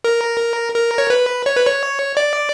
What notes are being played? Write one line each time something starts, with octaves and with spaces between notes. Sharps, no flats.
A#4
A#4
C#5
B4
C#5
B4
C#5
D5